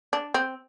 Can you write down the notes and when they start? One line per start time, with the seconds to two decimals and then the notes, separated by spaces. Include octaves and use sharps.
0.13 D4
0.34 C4